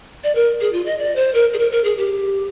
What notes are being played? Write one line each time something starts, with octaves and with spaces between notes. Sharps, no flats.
D5
A#4
G#4
F4
D#5
D5
C5
A#4
G#4
A#4
A#4
G#4
G4